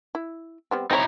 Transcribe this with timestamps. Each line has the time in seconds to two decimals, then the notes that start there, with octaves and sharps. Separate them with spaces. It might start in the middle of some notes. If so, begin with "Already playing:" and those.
0.15 E4
0.71 G3 B3 C4
0.91 C4 D#4 E4 G#4 C#5 A#5